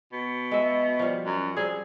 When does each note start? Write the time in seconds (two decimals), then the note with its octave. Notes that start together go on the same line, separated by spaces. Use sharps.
0.13 B2
0.51 G#3 E5
0.99 F3 G3
1.26 F#2
1.57 G3 C4 G#4